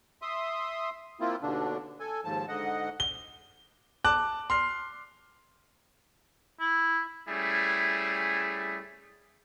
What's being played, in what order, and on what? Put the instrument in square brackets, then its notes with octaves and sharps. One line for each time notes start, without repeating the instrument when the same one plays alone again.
[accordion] E5 C6 D#6
A#3 C4 E4 F4
D#2 B2 D3 D4
A4 G#5
D#2 G#2 F3 A5
G#2 D3 D#5 F#5
[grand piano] G7
A5 D6 F#6
C6 F6 C7
[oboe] E4
[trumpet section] G3 A3 C#4 E4 G#4